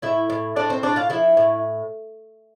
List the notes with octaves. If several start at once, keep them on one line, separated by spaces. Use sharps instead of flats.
A2 E4 E5
A2
A2 D4 D5
C4 C5
A2 D4 D5
F4 F5
F3 E4 E5
A2